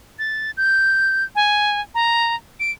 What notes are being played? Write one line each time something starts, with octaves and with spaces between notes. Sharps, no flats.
A6
G6
G#5
A#5
D7